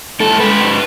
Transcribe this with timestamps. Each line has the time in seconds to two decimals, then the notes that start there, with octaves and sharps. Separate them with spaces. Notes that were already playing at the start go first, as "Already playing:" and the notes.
0.20 G#2 A4
0.40 G#3 B4
0.61 G#2